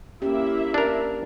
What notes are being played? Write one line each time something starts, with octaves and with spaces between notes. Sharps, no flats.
A#3 C#4 E4 G4 E5
D4 A#4